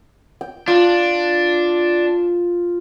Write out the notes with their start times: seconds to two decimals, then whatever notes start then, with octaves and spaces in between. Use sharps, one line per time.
0.41 G5
0.68 D4 F4